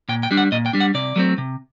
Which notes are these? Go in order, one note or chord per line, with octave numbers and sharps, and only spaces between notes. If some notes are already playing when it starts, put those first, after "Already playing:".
A#2 G5
G5
G3 D4
F#5
A#2 D#5
G5
G3 D4
F#5
C3 D5
F#3 A3 C4
C3